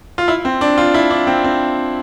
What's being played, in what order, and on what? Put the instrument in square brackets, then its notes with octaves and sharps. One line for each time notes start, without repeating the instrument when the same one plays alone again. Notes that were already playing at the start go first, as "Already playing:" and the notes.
[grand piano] F4
E4
C4
D4
F4
E4
D4
C4
C4